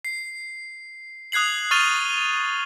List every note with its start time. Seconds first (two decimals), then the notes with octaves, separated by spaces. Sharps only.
0.05 C7
1.32 D#6 F#6 G#6 C7 F#7
1.71 C#6 F6 A6 D#7 F7 G7